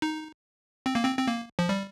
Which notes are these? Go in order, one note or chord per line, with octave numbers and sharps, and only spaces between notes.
D#4
C4
A#3
C4
C4
A#3
F3
G3